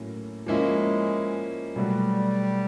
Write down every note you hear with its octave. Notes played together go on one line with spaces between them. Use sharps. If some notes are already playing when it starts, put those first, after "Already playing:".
Already playing: A2 F#3 A#3 C#4
F3 G#3 A#3 C#4 E4
B2 F#3 G3 A3